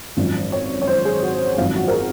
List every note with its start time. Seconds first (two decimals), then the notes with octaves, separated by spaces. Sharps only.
0.17 G#1 F#2 F3
0.52 C#5
0.82 C#5
0.88 C5
1.05 G#4
1.22 F#4
1.58 G#1 F#2 F3 F4
1.76 F#4
1.88 A#4
1.93 G#4